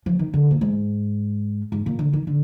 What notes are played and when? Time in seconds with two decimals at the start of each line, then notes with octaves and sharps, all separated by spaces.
0.06 F3
0.19 D#3
0.34 D3
0.51 A#2
0.61 G#2
1.72 G#2
1.86 A#2
1.99 D3
2.13 D#3
2.27 D3